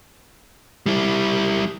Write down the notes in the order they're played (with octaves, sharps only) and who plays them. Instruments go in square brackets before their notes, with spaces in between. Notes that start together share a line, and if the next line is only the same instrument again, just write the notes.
[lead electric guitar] G3 E4